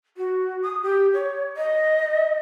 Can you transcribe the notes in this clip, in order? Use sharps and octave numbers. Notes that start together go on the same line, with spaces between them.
F#4
D#6
G4
C#5
D#5